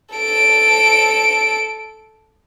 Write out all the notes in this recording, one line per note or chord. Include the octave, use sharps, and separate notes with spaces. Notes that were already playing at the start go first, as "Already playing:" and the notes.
A4 D7